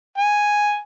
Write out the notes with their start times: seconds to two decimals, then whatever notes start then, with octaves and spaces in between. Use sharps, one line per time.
0.18 G#5